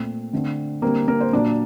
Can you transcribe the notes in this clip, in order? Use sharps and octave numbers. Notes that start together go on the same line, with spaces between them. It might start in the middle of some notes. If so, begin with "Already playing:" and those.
Already playing: A#2 A3 C4
D3 A3 C4
D3 G3 A#3 C4 A#4
A#3 A#4
C5
A#2 F#3 A#3 D4 D5